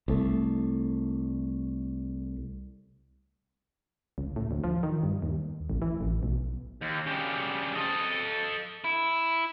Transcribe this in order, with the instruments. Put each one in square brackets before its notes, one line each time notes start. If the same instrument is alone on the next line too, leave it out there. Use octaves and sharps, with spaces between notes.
[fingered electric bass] C2 A3
[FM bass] C#2
A2
D2
F3
D#3
G2
D#2
A1
E3
A1
B1
[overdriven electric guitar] D#2
C#3 G3
A4 D#5
E4